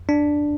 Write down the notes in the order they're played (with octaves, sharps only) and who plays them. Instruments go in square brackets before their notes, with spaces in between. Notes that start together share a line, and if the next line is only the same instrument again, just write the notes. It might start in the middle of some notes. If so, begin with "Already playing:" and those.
[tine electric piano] D4